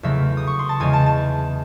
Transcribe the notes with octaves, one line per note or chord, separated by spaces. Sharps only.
E2 C#3 F#3 A3 E5
D#6
C#6
C6
A5
E2 C#3 G#3 G#5
A5
A5